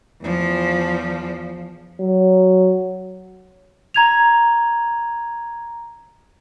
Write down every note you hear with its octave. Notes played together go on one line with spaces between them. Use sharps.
E2 F3
F#3
A#5 G#6 F7